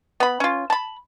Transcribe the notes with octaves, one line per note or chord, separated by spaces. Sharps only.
B3 B5
C#4 F4
A5 B5